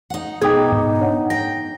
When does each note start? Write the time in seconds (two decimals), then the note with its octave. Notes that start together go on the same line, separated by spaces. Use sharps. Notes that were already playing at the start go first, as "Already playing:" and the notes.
0.10 D#4 F#5
0.42 B2 B3 D#4 G#4 G5 D6 D#6 G#6
0.72 G#2
1.00 D4 C#5 F#5
1.30 G5 A#6